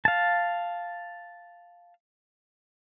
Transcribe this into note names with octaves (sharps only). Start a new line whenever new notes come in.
F5 A5